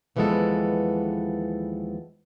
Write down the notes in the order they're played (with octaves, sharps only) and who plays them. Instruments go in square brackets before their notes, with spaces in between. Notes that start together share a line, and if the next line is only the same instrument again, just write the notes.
[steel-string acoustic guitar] D#2 E3 F3 G#3 B3 A4